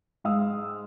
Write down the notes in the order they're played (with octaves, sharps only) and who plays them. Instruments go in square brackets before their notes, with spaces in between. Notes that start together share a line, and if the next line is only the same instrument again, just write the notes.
[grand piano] G#2 G#3 F5 D#6 E6